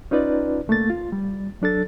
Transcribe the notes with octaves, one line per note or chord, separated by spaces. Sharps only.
C#4 D#4 F4 B4 D5
C2 A3 A#3 A6
F4
G3
F#3 D4 A4 A6